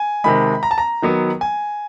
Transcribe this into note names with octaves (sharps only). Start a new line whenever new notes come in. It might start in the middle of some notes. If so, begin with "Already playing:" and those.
Already playing: G#5
C3 D#3 G#3 B5
A#5
A5
A#5
D#3 F#3 B3
G#5